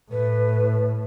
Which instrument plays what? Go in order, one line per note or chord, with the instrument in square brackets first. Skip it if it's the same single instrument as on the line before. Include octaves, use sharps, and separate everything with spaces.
[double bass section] A2 [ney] B4